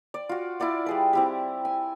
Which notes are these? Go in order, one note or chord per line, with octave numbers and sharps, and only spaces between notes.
D5
F4 F#4
E4 F4 D5 F#5
G3 G#4 B4
C4 E4 G4
G#5